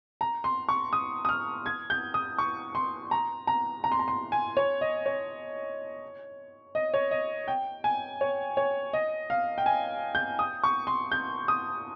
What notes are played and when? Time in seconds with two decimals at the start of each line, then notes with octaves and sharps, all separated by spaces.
0.21 A#5
0.44 C6
0.69 C#6
0.93 D#6
1.25 D#6
1.29 F6
1.66 G#6
1.90 G6
2.14 D#6
2.38 C#6
2.75 C6
3.11 A#5
3.47 A#5
3.84 A#5
3.92 C6
3.99 A#5
4.08 C6
4.32 G#5
4.57 C#5
4.81 D#5
5.06 C#5
6.75 D#5
6.94 C#5
7.11 D#5
7.48 G5
7.84 G#5
8.21 C#5
8.57 C#5
8.93 D#5
9.30 F5
9.58 G5
9.66 G#5
10.15 G6
10.39 D#6
10.64 C#6
10.87 C6
11.12 G6
11.48 D#6